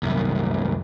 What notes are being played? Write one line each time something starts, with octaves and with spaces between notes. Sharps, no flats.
C2 F#2